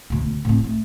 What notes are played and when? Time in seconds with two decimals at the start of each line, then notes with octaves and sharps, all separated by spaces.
0.10 D2 B2
0.45 A2 C4
0.64 A3